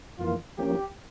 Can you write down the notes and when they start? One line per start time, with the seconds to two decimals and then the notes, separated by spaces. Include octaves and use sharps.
0.18 F2 E3 A#3 F4
0.58 F3 A#3 C#4 G4